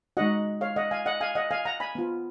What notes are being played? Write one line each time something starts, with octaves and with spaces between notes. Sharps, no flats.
G#3 D#4 F#4 D#5 F#5
C#5 F5
D#5 F#5
F5 G#5
D#5 F#5
F5 G#5
D#5 F#5
F5 G#5
F#5 A#5
G#5 B5
B3 F4